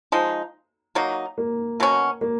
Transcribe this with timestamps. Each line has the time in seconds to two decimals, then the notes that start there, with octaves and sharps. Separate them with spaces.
0.12 F3 G#3 D#4
0.95 F#3 A#3 D#4
1.38 A#3
1.80 B2 F#3 C#4
2.21 A#3